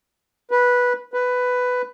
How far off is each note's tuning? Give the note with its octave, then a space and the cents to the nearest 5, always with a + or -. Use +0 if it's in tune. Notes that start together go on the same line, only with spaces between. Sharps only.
B4 -10
B4 +10